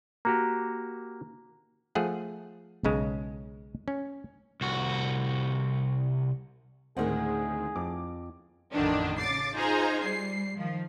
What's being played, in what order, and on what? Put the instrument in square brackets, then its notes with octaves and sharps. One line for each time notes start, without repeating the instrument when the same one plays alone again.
[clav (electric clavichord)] A#3 F#4 G4 [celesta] A#5
[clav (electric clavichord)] F3 A3 G#4 F#5
B1 C#3 G#3
C#4
[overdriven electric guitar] C2 F#4
[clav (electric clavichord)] D2 [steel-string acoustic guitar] A2 A#4 F#5 [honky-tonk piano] D#3 G#3 C4 [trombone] G#4
[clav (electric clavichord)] F2 [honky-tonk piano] D6
[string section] A1 F2 D3 D#3 D4
C#3 D6 A6 C7
D#4 F4 G#4 C5 G#5 A#5
G3 C7
D#3 F3